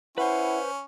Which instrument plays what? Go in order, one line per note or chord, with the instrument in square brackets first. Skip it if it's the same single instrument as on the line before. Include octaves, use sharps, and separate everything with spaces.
[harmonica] C#4 [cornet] E4 [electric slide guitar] B4 C5 [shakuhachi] F#5